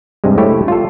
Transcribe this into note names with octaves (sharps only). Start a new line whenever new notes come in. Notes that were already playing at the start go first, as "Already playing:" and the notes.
G2 C3 G3 G#3
A3 E4 G4 C#5
F4 A4